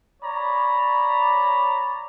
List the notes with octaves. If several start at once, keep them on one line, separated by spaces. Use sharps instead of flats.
C#5 D5 A#5 B5